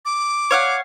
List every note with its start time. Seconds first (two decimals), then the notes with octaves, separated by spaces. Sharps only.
0.05 D6
0.51 C#5 F5 F#5